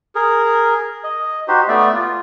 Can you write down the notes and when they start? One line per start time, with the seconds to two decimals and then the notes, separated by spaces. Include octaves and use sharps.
0.15 G#4 A#4
1.04 D#5
1.48 D#4 F#4 G4 C5
1.68 A3 B3 D5 E5
1.93 F4